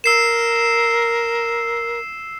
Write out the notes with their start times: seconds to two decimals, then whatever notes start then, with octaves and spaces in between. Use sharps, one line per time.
0.04 A#4 E6 C7 E7